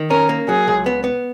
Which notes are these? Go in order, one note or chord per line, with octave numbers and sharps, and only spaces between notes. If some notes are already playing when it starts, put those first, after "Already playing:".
Already playing: D#3
C#4 A#4
A#3
F#3 G#4
C#2
B3
B3